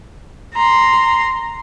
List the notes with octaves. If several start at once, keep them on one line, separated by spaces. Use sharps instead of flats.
A#5 C6